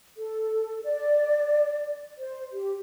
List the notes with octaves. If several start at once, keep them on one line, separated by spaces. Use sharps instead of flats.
A4
D5
C5
G4